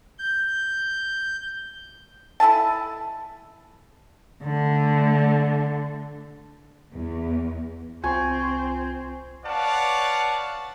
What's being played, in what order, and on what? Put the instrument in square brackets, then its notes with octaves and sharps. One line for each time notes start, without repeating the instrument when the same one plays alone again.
[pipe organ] G6
[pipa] E4 A4 G#5 A5
[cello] D3 A3
[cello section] E2
[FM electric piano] C2 F4 [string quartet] C4 [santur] G#5 C#6
[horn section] B4 C#5 D5 F5 F#5 A5